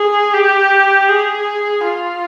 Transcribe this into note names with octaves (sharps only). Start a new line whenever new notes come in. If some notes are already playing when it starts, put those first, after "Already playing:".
Already playing: G#4
G4
G#4
F4